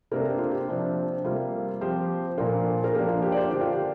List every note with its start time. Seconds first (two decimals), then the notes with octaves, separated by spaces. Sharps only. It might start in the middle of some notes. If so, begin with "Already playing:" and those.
0.11 C3 A#3 D4 A#4
0.25 G4
0.38 F4
0.51 G4
0.68 C3 F3 D4
1.24 C3 G3 A#3 F4
1.81 F3 C4 G4 C5
2.38 A#2 F3 A#3 D4 F4 A#4
2.84 A#4
2.94 F3 A#3 D4 G4
3.08 F4
3.22 G4
3.32 D5
3.37 G4 C5
3.51 D3 A#3 D4 G4
3.61 F4
3.72 G4